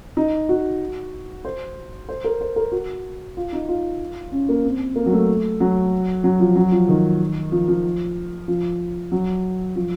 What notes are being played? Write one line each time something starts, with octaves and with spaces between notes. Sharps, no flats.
D#4
F#4
C5
C5
A#4
C5
A#4
F#4
F4
D#4
F4
C#4
A#3
C4
A#3
F#3
A3
F#3
F#3
F3
F#3
F3
D#3
F3
F3
F3
F#3
F3